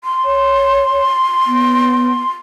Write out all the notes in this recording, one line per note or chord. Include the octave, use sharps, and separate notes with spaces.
C6
C#5
B3